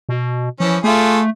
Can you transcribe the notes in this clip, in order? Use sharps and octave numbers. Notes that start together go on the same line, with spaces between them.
B2
E3 F3 C#4
A3 F4 G#4 A4